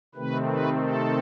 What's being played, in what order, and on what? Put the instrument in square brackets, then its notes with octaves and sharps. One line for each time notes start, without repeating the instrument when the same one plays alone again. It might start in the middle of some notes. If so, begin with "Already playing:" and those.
[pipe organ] C3 D#3 A3 C4 B4
B4
A4